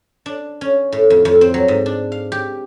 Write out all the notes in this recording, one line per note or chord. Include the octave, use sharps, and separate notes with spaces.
D4
C#4
A2
F2
F2
C4
F#3
G#2
D4
F5
G4